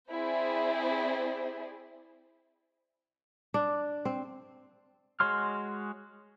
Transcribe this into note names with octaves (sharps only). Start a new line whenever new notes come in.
C4 E4 G#4 C5 D5
D4
C4
G#3 F#4 C#5 C6 F6